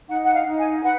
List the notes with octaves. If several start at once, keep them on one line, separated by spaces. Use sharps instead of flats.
D#4 F#5
F#5
F5
D#4
G#5
B4 F#5